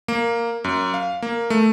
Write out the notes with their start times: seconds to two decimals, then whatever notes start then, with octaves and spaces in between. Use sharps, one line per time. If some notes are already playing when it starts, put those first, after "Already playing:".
0.08 A#3
0.64 F#2
0.94 F5
1.22 A#3
1.50 A3